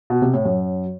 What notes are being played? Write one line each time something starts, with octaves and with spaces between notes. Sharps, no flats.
B2
C3
A2
F#2